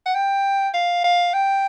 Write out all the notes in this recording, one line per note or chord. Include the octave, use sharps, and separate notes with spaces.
F#5
G5
F5
F5
G5